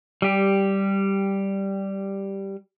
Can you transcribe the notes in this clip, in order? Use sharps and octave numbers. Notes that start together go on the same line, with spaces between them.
G3 G4